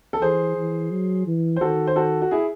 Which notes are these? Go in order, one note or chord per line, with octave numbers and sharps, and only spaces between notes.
A4
E3 G#4 C5
E3
F#3
E3
C5
D#3 F#4 A4
C5
F#4 A4
F#4
E4 G#4